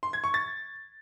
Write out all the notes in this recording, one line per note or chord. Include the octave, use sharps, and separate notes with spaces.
C6
G#6
C#6
A6